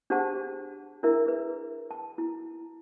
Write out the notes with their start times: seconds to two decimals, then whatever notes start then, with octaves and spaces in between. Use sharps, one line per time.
0.10 D4 G4 G#4 C5 F#5 A5
1.03 D4 E4 G#4 A#4 E5
1.26 G#4 B4
1.91 A5
2.18 E4